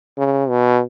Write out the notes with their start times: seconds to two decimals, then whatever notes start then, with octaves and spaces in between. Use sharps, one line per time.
0.18 C#3
0.49 B2